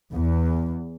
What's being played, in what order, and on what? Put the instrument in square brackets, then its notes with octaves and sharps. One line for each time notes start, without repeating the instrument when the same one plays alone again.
[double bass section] E2